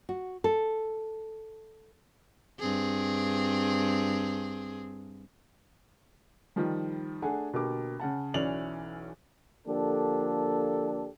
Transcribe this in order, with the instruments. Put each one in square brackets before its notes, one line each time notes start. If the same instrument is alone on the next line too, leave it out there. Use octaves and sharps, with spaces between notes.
[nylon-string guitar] F#4
A4
[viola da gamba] G2 C4 G#4
[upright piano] D#3 F3 G3
A3 D4 G#4 F#5 G#5
B2 D3 A#3 G4 D6
C#3 F#5 A5
B1 E3 C#4 D5 F7 F#7
[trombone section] D3 F3 A#3 D4 G4 A4